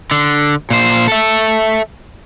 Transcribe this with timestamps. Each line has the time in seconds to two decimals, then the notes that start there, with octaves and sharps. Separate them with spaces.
0.11 D3
0.70 A#2 C5
1.08 A4 E5